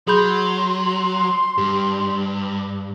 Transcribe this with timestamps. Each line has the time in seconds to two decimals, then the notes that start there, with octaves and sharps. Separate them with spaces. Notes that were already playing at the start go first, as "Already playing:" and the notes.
0.08 F#3 G#4 B5 C6 G6
1.58 G2 G4